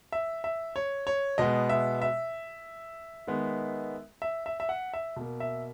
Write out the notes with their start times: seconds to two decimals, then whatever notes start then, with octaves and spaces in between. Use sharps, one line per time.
0.12 E5
0.44 E5
0.76 C#5
1.07 C#5
1.38 B2 G#3 B3 D#5
1.69 E5
2.02 E5
3.27 D#3 G#3 B3
4.22 E5
4.46 E5
4.60 E5
4.69 F#5
4.94 E5
5.16 B2 A#3
5.40 E5